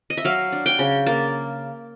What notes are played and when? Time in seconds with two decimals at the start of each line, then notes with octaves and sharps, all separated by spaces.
0.10 D#5
0.17 E5
0.25 F#3 F5
0.52 D4
0.66 G5
0.79 C#3
1.06 A#3 A5